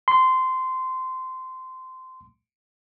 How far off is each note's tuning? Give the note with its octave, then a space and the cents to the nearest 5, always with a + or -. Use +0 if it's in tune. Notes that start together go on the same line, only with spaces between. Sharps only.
C6 -15